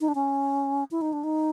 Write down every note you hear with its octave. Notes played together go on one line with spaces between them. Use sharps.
D#4
D4
C#4
E4
D#4
D4
D#4